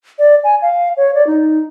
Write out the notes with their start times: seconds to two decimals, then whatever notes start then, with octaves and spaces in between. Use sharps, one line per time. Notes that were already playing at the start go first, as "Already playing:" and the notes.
0.19 D5
0.44 G#5
0.62 F5
0.97 C#5
1.14 D5
1.27 D#4